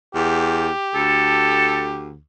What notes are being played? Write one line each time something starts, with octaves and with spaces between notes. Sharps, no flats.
E2 G4
D2 A4